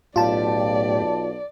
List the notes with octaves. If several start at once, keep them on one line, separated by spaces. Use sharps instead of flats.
B1 A2 F4 G4 D5 A5